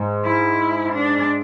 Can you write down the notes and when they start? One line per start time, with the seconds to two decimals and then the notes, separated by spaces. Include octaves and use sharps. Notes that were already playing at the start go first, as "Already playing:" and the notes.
Already playing: G#2
0.25 E4
0.93 D4